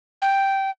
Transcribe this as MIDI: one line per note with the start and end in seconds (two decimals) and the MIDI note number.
0.22 0.70 79